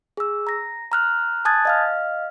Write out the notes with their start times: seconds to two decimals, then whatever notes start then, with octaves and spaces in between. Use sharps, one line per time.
0.17 G#4 E6
0.47 A#5 A#6
0.92 A#5 F6 F#6
1.45 G#5 A5 D#6 F#6 G#6 A6
1.65 D#5 F5 F6